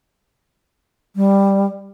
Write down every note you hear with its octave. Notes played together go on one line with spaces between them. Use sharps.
G3